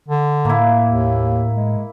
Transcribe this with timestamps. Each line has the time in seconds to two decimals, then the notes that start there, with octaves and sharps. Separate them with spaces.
0.08 D3
0.45 A2 A#3 E4
0.86 D#2
1.54 G#3